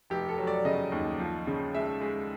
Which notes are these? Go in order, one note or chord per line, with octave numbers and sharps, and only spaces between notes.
F1 G4
A4
F#3
D5
C#3 D#5
D#2
F3
C#3
G#3 E5
G#3